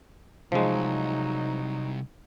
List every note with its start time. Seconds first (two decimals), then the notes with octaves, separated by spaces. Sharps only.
0.52 C2 F3 F#3 G#3 D#4